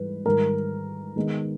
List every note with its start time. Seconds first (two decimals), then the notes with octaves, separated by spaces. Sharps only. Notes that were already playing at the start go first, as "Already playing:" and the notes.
Already playing: G#2 E3 G3 B4
0.25 G#2 D#3 G3 A#4
1.16 D#3 G#3 B3 D#4